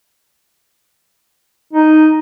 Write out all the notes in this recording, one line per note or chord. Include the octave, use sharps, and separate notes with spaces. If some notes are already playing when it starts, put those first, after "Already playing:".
D#4